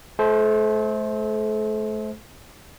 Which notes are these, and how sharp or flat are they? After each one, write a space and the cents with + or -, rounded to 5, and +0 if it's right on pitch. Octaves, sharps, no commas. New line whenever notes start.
A3 -35 A4 -40 C5 +0